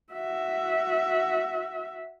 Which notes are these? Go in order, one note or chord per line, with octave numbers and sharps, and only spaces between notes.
F#4 E5